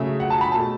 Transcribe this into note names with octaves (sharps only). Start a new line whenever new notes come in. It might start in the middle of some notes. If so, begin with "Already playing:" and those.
Already playing: C#3 F#3 A3 E5
F#5
A5
B5
B2 A3 A5